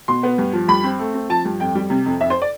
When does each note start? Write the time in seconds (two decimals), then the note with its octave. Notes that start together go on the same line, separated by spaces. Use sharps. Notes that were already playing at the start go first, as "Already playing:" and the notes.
0.08 B2 C6
0.23 B3
0.38 G2
0.53 F3
0.68 G2 B5
0.84 C4
0.99 A3
1.14 C4
1.29 F3 A5
1.45 G2
1.60 F2 G5
1.75 G3
1.90 C3
2.06 F2
2.21 F2 E5
2.30 C5
2.42 D5